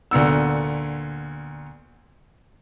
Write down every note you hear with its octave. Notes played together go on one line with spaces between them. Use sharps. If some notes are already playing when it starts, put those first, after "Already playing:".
D2 A#2 B3 E6